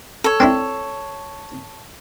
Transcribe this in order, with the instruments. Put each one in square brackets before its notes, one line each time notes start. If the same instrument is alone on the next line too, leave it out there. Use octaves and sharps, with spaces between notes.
[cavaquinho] A4 C#5
[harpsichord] C4 D4 E4